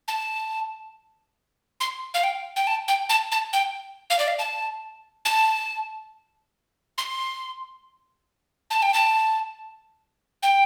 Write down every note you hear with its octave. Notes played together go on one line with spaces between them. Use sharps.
A5
C6
F5
G5
G5
A5
G5
A5
A5
G5
F5
D5
F5
A5
A5
C6
A5
G5
A5
G5